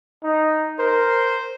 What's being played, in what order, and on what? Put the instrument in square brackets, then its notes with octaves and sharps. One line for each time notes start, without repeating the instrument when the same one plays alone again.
[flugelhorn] D#4
[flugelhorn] A#4 [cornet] C5